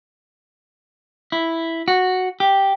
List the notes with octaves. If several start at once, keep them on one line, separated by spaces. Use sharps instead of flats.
E4
F#4
G4